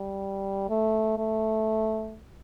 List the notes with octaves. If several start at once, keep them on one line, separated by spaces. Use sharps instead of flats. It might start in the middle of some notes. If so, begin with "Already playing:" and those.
Already playing: G3
A3
A3